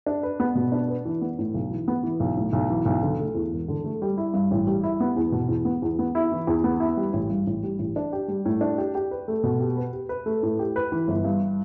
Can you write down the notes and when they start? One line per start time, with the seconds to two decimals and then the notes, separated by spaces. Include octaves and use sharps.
0.06 D4
0.23 B4
0.40 B3
0.55 B2
0.72 D4
0.89 B4
1.05 E3
1.22 B3
1.39 A2
1.54 B1
1.71 E3
1.88 B3
2.03 E3
2.20 B1
2.37 A2
2.53 B1
2.70 E3
2.86 B1
3.02 D3
3.20 A3
3.35 E2
3.52 E1
3.68 D3
3.84 A3
4.02 G3
4.17 E4
4.34 G2
4.51 A1
4.67 G3
4.83 E4
5.00 B3
5.16 E2
5.32 B2
5.49 E2
5.65 B3
5.82 E2
5.99 B3
6.15 E4
6.32 E3
6.47 E2
6.64 B3
6.80 E4
6.97 G3
7.13 A1
7.30 G2
7.47 A1
7.63 G3
7.79 A1
7.96 D4
8.13 G4
8.28 G3
8.46 A2
8.61 D4
8.78 G4
8.95 G4
9.11 B4
9.28 A3
9.43 B2
9.60 G4
9.77 B4
9.93 G4
10.09 B4
10.26 A3
10.43 A2
10.59 G4
10.76 B4
10.92 E3
11.08 G1
11.24 G2